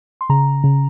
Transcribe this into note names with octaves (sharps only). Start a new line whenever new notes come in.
C6
C#3 A#5
C#3